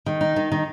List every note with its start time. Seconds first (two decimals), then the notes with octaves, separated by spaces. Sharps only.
0.06 D#3
0.21 D#4
0.36 D#3
0.52 D#3